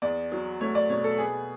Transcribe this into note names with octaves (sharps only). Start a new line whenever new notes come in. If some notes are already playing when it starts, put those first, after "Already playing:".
E2 D5
F#3
A3 C#5
D5
B2 C#5
A4
B3 G#4